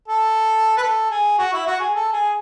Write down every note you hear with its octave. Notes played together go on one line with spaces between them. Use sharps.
A4
B4
A4
G#4
F#4
E4
F#4
G#4
A4
G#4